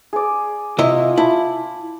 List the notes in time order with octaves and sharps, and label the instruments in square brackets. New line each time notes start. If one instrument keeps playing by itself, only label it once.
[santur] G#4 D5
[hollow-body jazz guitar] C3 E4 D#5 [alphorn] F4
[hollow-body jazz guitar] E4 [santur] A5